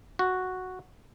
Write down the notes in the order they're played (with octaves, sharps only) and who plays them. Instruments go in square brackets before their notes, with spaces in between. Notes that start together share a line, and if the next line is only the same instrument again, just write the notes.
[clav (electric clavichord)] F#4